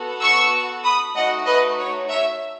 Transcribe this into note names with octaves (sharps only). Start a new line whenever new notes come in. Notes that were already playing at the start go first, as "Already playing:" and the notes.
Already playing: B3 F#4 A4
C#6 E6
B5 D#6
A3 D#4 F#4 D#5 F#5
B4 D#5
C#5
C#5 E5